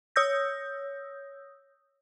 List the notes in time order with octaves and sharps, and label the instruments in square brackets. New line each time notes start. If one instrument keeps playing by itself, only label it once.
[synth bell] C#5 D#6 E6 G6 A#6